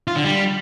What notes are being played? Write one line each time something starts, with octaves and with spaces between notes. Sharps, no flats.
F4
D3
G3